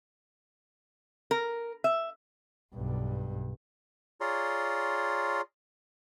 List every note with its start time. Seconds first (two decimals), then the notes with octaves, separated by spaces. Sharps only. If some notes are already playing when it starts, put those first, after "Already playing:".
1.31 A#4
1.84 E5
2.74 B1 G2
4.21 F4 G#4 C#5 D5 A#5 C6